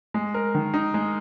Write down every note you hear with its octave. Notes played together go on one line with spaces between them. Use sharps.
G#3
A#4
D#3
D#4
G#3